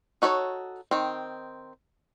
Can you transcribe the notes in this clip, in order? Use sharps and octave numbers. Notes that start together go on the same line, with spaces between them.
D#4 F#4 A4 A#4 C#5
D#3 C4